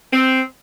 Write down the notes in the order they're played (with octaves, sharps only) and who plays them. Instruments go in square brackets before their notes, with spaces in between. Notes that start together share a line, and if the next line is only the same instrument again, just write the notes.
[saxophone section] C4